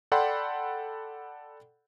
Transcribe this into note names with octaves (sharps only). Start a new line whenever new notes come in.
A4 D5 F#5 G5 B5 C6